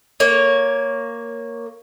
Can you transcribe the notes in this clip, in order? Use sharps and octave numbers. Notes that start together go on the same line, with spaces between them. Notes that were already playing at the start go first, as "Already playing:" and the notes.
A#3 C#5